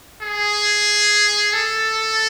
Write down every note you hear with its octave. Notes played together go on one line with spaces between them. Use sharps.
G#4
A4